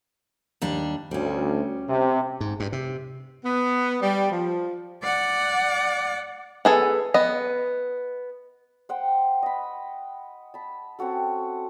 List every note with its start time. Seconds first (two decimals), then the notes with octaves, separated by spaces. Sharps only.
0.62 D#2 G3 D4
1.11 D2 G3 C#4
1.89 C3
2.41 G#2
2.60 G2
2.72 C3
3.44 B3
4.02 G3
4.31 F3
5.03 D5 F#5
6.65 B3 G#4 A4
7.14 B3 D#5
8.89 C5 F#5 G5
9.43 D#5 B5
10.54 A5 B5
10.99 C4 C#4 F#4 A4